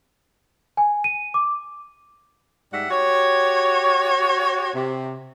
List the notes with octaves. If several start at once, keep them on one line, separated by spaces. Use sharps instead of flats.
G#5
D#7
D6
G#2 G3 E5 F#5
F#4 G4 C#5
C3